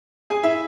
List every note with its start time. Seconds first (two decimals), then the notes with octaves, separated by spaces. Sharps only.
0.30 G#4 G#5
0.43 E4 E5